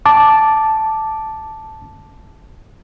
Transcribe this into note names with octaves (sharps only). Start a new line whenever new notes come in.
A5 D6